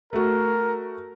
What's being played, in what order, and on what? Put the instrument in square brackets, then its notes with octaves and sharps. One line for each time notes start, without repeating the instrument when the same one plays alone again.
[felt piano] A3 F#4 [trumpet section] A#4